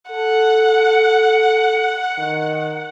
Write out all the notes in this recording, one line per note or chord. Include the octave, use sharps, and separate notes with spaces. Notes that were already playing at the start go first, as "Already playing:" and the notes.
A4 F#5
D#3